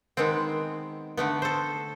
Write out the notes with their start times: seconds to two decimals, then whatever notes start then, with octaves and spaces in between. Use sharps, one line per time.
0.17 D#3 G#3 B3 C4
1.17 D3 A3 B3
1.42 A4 C5